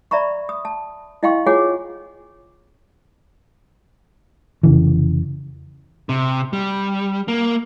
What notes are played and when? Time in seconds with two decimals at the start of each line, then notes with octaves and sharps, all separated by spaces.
0.11 D5 E5 A#5 B5 C#6
0.49 D#6
0.65 A5
1.23 E4 D#5 F5 G5 C6 C#6
1.46 F4 G#4 C#5 F#5 G#5 D6
4.63 F1 C#3 E3
6.09 C3
6.53 G3
7.28 A#3